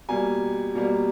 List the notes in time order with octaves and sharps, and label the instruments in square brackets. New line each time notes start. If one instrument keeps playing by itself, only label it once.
[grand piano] B2 G3 A#3 G#5
B2 G3 A#3